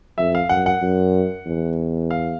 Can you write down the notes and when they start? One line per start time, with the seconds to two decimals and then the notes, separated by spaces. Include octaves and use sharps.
0.18 F2 E5
0.35 F5
0.49 F#2 F#5
0.66 F#5
0.82 F#2
1.46 E2
2.11 F5